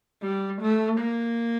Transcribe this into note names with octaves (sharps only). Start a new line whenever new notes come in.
G3
A3
A#3